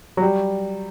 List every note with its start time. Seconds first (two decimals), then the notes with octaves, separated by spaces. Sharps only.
0.17 F#3
0.22 G3